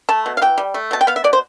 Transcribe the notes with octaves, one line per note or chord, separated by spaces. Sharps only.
A3 A5
B2
F5
E3 G5
G3
A3
B2 A5
G5
B3 F5
E5
B2 D5
C5